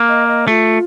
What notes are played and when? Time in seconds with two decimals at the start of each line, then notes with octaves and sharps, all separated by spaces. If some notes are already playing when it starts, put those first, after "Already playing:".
Already playing: A#3
0.09 D#5
0.28 D#5
0.47 A3 F4 G4